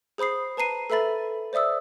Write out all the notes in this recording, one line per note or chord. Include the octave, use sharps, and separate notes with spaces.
G#4 C5 B5 D#6 C7
B4 A5 A#5 C7 D#7
A4 B4 E5 B5 A6
C5 D5 E5 D#6 E6